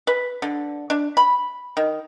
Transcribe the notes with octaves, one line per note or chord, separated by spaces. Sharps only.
B4
D3
D4
B5
D#3